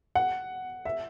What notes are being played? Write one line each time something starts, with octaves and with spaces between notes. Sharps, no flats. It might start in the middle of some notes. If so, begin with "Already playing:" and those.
F#5
E5